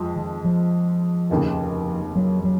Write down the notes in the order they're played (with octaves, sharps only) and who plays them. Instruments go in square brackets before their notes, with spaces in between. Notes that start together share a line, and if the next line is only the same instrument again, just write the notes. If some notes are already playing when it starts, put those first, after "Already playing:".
Already playing: [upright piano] F2 F3 G#3
[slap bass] D#3
F3
[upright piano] F1 D#2 C#3
[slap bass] F#3
F#3